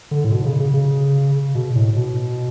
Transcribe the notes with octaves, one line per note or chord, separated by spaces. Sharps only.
D3
A2
B2
C#3
C#3
C#3
B2
A2
B2